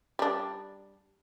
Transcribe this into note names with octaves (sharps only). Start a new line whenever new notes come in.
G3 D4